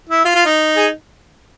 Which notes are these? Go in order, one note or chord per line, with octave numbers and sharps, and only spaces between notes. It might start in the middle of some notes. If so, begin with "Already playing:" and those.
E4
F4
F4
D#4
G#4